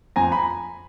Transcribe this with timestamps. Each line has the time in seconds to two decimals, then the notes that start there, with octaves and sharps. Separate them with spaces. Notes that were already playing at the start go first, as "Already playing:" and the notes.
0.16 F2 G#5 A#5
0.32 B5